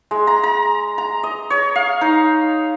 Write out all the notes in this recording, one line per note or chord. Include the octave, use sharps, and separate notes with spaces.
G#3
A#5
A#5
A#5
D#5
C#5
F5
D#4